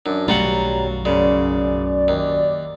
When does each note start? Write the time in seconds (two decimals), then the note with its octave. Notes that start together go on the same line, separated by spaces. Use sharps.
0.06 F#2 D4
0.28 B1 F#3 G3 A3 F4 F#4 F#5 A#5
1.05 F#2 C#3 D5
2.08 D#2